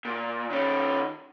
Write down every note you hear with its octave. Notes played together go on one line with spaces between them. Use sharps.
A#2
D#3 C#4